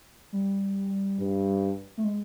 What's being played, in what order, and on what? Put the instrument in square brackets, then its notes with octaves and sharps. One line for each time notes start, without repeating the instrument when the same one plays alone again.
[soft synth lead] G3
[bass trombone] G2
[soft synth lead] A3
G#3